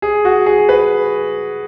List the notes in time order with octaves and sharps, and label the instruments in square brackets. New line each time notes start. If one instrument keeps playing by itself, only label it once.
[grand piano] G#4
F#4
G#4
B4